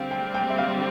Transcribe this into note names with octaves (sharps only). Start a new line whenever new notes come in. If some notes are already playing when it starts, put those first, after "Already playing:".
Already playing: D3 G3 C4 F5
G5
G5
E5
F5